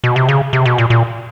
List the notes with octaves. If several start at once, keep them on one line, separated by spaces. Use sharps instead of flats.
B2
C3
C#3
C3
B2
A#2
A#2